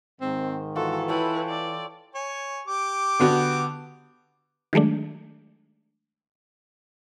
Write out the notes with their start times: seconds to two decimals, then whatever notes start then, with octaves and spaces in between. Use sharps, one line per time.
0.21 G#2 D#3 C4
0.76 E3 F4 F#4 A4
1.08 E4 A4 B4 C#5 G5
1.48 D5
2.15 C#5 G#5
2.67 G4 D6
3.19 D3 B3 F#4
4.73 D#3 F#3 G#3 A3 D4